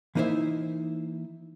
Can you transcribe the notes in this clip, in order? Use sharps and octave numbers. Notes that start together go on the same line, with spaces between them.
E3 A#3 D#4 E4 C5 E5